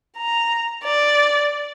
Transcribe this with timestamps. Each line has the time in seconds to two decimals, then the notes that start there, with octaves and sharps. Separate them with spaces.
0.18 A#5
0.84 D5